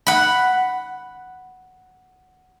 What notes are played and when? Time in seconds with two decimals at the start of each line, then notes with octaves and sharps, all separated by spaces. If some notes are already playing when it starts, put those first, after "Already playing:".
0.07 F#5 B5